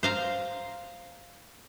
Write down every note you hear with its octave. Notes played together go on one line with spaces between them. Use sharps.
C5 F5 A#5